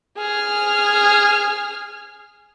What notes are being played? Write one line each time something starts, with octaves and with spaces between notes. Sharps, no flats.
G#4 F6